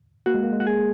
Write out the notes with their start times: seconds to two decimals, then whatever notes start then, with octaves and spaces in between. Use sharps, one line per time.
0.26 A#3 F#4
0.34 G#3
0.43 A#3
0.53 G#3
0.60 F#4
0.67 G#4